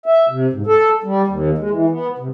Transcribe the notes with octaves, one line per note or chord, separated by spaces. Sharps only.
E5
C3
G#2
A4
G3
D#2
G#3
E3
B3
C3